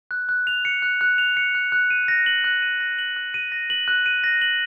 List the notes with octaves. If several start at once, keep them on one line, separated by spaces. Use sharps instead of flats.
F#6
F#6
F7
C#7
F#6
F#6
F7
C#7
F#6
F#6
D#7
A#6
F#7
F#6
D#7
A#6
F#7
F#6
D#7
A#6
F#7
F#6
D#7
A#6
F#7